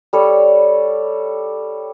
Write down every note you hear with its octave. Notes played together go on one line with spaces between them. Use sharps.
G3 A4 C#5